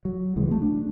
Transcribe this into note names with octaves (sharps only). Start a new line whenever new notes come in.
F#3
C#2 C3 E3 G#3
G#3 A3
D4